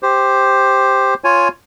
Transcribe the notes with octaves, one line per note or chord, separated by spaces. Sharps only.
G4 C5
F4 C#5 G#5